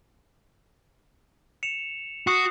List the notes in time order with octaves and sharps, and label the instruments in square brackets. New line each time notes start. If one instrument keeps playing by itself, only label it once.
[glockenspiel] C#7 E7 F7
[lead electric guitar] F#4 [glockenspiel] D#6 F#6 C7